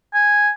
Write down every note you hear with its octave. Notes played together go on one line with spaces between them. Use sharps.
G#5